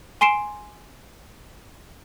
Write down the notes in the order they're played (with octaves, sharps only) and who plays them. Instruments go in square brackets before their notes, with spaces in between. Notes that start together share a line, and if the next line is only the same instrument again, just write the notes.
[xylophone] G#5 C6 C7 D7 E7